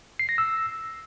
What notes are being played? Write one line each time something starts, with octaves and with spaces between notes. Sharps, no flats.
C7
A#6
E6